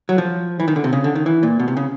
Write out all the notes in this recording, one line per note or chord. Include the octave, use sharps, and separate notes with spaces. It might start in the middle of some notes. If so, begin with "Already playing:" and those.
F#3
F3
E3
D#3
D3
C3
C#3
D3
D#3
E3
A#2
B2
C3
C#3